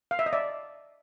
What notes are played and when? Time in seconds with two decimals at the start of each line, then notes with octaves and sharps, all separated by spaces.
0.11 F5
0.19 E5
0.26 D#5
0.33 D5 E5